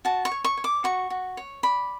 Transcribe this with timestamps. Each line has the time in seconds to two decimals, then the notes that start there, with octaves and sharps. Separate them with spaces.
0.05 F#4 A5
0.25 C#6
0.32 C#5
0.44 C#6
0.57 C#5
0.64 D6
0.84 F#4 C#6
1.10 F#4
1.37 C#5
1.63 D5 B5